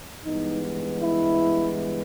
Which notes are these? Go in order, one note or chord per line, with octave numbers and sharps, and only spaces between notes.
G2 E3 G#3 B3 D#4
E4